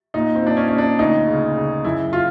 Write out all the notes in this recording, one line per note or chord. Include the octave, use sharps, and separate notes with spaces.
A#2 D#4
C4
A#2 D4
C#4
A#2 C#4
D4
D2 D#4
C#3
C#3
F#2 E4
F4